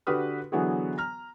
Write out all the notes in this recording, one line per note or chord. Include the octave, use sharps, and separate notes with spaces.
D3 F#4 G4 B4 D#6 F6
D3 E3 F#3 B3 F#4 G#4
A#5 F6